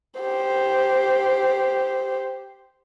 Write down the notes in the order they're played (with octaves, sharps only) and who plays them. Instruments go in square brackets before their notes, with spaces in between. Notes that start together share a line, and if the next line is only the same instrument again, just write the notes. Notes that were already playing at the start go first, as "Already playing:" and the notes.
[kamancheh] G4 C5